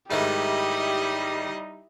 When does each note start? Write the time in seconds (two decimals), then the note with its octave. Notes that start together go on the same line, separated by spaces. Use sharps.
0.11 G#2 D#3 G3 A3 D#4 E4 G4 D#5